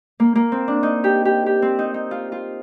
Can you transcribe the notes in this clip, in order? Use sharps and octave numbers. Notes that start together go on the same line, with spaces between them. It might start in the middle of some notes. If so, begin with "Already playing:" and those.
A#3
A#3
C4
D4
D#4
G4
G4
G4
C4
D#4
D#4
F4
F4